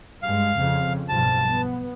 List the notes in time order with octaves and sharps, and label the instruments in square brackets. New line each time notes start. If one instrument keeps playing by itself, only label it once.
[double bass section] G2 G#3 [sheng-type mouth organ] F5
[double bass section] F2 C#3
[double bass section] B1 G2 F3 [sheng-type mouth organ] A5
[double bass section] B3